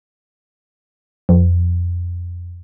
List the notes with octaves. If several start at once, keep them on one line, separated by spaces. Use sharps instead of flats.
F2